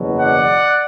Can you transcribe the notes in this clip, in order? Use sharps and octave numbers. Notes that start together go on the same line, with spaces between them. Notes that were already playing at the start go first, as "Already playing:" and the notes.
Already playing: F#1 E2 B2 F#3
D5 F#5